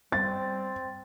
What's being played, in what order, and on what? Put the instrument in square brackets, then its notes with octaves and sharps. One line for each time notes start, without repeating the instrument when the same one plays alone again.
[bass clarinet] G3 [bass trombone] C4 [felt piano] A6